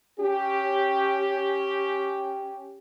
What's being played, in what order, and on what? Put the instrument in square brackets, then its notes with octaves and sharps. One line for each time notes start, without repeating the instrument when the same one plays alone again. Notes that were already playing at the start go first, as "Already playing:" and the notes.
[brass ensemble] C#4 G4